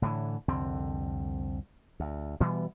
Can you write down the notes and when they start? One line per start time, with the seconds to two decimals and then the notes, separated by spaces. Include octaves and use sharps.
0.02 A2 D3 E3
0.48 C2 F2 D3 C4
2.00 D2
2.40 B2 E3 G3 B3